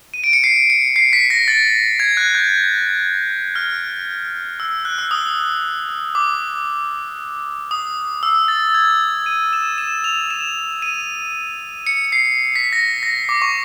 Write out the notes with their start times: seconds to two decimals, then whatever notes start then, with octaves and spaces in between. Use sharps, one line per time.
0.14 D#7
0.24 D7
0.33 C#7
0.44 C7
0.70 C#7
0.96 C7
1.13 B6
1.30 A#6
1.48 A6
2.00 G#6
2.17 F#6
2.35 G6
3.56 F6
4.60 E6
4.85 F#6
4.98 E6
5.11 D#6
6.15 D6
7.71 D#6
8.23 E6
8.48 A6
8.70 A6
8.74 G#6
9.26 D#7
9.53 E7
9.78 E7
10.04 F7
10.30 E7
10.82 D#7
11.87 C#7
12.12 C7
12.56 B6
12.73 A#6
13.03 A#6
13.29 D6
13.42 C#6